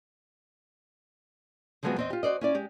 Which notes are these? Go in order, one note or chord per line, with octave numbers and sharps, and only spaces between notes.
D3 F3 F#3 G#3 B3 C4
E2 C4 D#5
F4 G4
F#4 C5 D5 D#5
C#4 E4 D5
G#3 G4